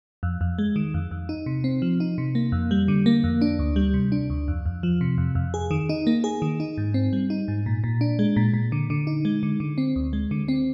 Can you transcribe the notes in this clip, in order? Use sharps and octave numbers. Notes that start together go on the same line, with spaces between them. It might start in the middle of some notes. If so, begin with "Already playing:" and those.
F2
F2
G#3
D#3
F2
F2
D#4
C3
C4
F3
D#4
C3
A#3
F2
G3
D3
A#3
F2
D4
D2
G3
C3
D4
D2
F2
F2
F3
C3
F2
F2
G#4
D#3
D#4
A#3
G#4
D#3
D#4
G#2
C4
G3
D#4
G#2
A#2
A#2
D4
G#3
A#2
A#2
D3
D3
D#4
G#3
D3
D3
C4
D2
G#3
D3
C4